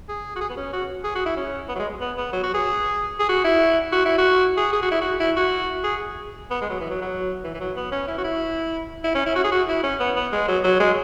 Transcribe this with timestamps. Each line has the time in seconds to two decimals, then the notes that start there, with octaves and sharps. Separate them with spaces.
0.09 G#4
0.36 F#4
0.41 G#4
0.50 B3
0.57 C#4
0.73 F#4
1.04 G#4
1.15 F#4
1.26 E4
1.37 C#4
1.68 B3
1.75 F#3
1.79 G#3
2.01 B3
2.17 B3
2.33 F#3
2.43 F#4
2.54 G#4
3.19 G#4
3.29 F#4
3.45 E4
3.92 F#4
4.05 E4
4.18 F#4
4.57 G#4
4.73 G#4
4.82 F#4
4.91 E4
5.01 F#4
5.20 E4
5.36 F#4
5.84 G#4
6.51 B3
6.61 G#3
6.70 F#3
6.81 E3
6.90 F#3
7.02 F#3
7.44 E3
7.54 E3
7.60 F#3
7.76 B3
7.92 C#4
8.08 E4
8.18 F#4
8.24 E4
9.04 E4
9.15 C#4
9.26 E4
9.36 F#4
9.44 G#4
9.52 F#4
9.69 E4
9.83 C#4
10.00 B3
10.16 B3
10.32 G#3
10.48 F#3
10.64 F#3
10.80 G#3